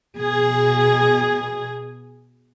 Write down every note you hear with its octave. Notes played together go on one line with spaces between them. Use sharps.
B2 G#4